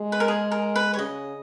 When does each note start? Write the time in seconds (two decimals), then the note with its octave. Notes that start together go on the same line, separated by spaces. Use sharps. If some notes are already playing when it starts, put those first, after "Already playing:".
Already playing: G#3
0.12 B4
0.20 A#4
0.28 G#4
0.52 A#4
0.76 B4
0.94 C#5
0.98 C#3 D#5